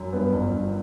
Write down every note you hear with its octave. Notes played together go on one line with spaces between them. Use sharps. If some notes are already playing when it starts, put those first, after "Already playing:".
Already playing: F#2
G2 B3 B4
G1
G1